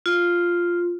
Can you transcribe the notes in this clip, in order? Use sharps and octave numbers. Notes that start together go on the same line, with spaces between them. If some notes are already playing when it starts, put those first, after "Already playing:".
F4